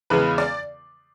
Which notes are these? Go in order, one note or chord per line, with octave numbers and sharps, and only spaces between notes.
E2 C#3 G#3 B3 B4
D5